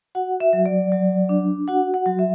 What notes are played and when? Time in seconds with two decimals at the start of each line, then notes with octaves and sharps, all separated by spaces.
0.15 F#4 F#5
0.40 E5
0.53 F#3
0.66 D5
0.92 F#3
1.29 D4
1.68 F#4 F#5
1.94 F#5
2.06 F#3
2.19 E5